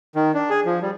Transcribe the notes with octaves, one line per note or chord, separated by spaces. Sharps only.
D#3
D4
G#4
F3
G3